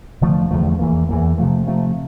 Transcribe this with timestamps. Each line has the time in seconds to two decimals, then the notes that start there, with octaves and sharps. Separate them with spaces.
0.21 E2 D3 F3 A3
0.51 E2 D3 F3 A3
0.79 E2 E3 A#3
1.09 E2 E3 A#3
1.38 C3 F3 A3
1.67 C3 F3 A3